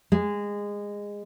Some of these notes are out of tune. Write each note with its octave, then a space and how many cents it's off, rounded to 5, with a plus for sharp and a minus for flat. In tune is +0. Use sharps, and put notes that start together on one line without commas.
G#3 -20